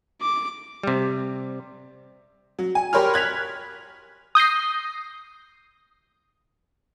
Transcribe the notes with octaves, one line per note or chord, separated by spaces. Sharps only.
D6
C3 G3
F#3
G#5
G4 A#4 C#5 B5 C6 F6
F#6 G#6 B6 F7
D#6 G6 A#6 C7